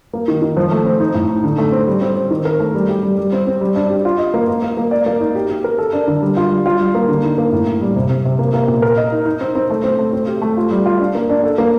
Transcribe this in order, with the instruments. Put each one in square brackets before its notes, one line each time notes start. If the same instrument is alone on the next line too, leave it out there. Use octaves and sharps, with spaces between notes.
[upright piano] A#3
D#3
D#3
F3
A3
C4
D#4
A2
D#4
D3
A3
C4
G3
C4
C4
D#3
A#4
A3
G3
G4
G3
G3
C4
C4
G3
D4
G4
F4
D#5
A#3
A#3
A#3
A#3
D5
A#3
D#4
G4
G4
A#4
A4
D4
D3
G3
F4
G3
F4
G3
A#3
D3
D#4
A#3
A2
A2
G3
C3
C3
C3
A#3
A#3
A#2
A#4
D#5
D#4
D#4
C4
C4
A3
C4
A3
C4
G4
A3
F4
G3
F4
D4
A#3
D4
A4
A#3